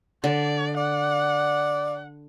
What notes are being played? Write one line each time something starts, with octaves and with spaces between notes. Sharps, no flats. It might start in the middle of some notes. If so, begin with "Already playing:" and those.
D3 D5
D5 F#5